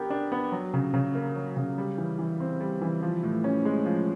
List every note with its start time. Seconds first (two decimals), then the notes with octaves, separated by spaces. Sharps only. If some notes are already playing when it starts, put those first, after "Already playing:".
Already playing: B3 D4 G4 A#4
0.10 D4
0.32 B3
0.52 F#3
0.74 C#3
0.94 C#3
1.15 A#3
1.36 F#3
1.57 C#3
1.78 G3
1.98 E3
2.19 E3
2.40 C4
2.60 G3
2.82 E3
3.03 F3
3.23 A2
3.44 C#4
3.65 G#3
3.86 F3